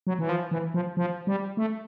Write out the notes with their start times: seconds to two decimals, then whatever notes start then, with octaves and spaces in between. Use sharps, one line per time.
0.07 F#3
0.19 E3
0.29 F3
0.51 E3
0.74 F3
0.97 F3
1.27 G3
1.57 A3